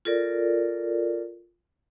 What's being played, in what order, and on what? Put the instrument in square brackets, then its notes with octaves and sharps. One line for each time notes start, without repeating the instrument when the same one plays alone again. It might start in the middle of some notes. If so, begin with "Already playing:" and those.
[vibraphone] F4 A4 A#4 D5